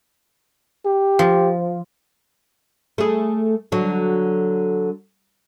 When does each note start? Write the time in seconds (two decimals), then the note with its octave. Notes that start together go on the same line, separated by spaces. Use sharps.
0.86 G4
1.19 F3
2.98 A3 G#4
3.72 D3 F#3